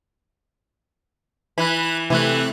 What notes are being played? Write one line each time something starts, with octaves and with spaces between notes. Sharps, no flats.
E3 B5 F#6
C3 E3 A3 F#6